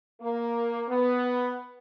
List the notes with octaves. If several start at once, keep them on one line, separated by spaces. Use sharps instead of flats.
A#3
B3